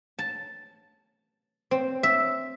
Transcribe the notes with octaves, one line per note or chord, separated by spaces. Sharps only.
A5
C4
E5